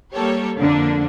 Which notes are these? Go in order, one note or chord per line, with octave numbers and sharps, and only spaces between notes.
G3 A#3 G4 A4 C#5
F2 D3 A#3 D4